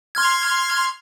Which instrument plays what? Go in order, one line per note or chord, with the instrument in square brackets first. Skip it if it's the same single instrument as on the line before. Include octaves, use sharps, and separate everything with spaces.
[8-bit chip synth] C6 F6 G#6